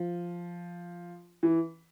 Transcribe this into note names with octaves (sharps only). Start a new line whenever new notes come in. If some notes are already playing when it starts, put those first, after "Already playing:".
Already playing: F3
E3